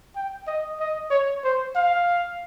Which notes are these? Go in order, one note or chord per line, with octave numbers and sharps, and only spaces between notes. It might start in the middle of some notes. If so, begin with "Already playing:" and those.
G5
D#5
D#5
C#5
C5
F5